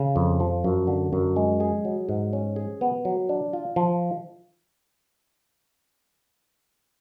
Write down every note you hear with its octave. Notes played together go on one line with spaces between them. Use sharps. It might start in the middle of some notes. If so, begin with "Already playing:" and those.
Already playing: C#3
F2
F3
F#2
D3
F#2
G#3
G#4
F#3
G#2
C#4
G#4
B3
F#3
D4
F4
F3